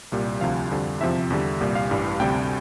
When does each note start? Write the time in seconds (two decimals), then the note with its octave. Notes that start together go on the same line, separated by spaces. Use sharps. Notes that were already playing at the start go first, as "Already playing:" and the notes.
0.12 C2 A#2 G3
0.41 D2 C3 F3 F5
0.71 F2 D3 G3
1.01 E2 C3 F3 E5
1.30 E2 D3 G3
1.60 C2 A#2 G3
1.75 F5
1.90 A1 G2 E3 G3
2.20 D2 C3 G3 G5